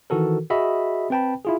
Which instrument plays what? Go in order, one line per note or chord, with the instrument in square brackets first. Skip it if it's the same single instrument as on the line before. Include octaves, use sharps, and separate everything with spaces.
[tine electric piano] D#3 E3 F#4 A4 A#4
F#4 G#4 D#5 E5 B5
C4 B4 G5 A5 B5
E4 F4 G#4